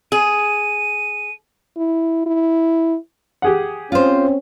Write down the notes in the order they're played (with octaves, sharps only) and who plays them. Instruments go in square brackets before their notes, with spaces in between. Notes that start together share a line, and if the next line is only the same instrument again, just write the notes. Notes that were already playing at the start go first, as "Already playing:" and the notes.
[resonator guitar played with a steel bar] G#4 [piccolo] D#7
[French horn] E4
E4
[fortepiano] G4 G#4 F#5
[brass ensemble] C4 C#4 [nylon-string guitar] F4 C5